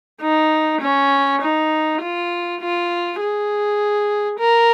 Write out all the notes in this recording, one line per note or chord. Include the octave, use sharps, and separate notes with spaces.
D#4
C#4
D#4
F4
F4
G#4
A#4